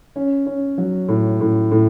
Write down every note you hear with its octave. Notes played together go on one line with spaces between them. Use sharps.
C#4
C#4
F#3
A2
A2
A2